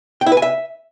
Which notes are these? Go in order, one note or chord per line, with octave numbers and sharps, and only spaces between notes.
G5
E4
B4
G#5
E5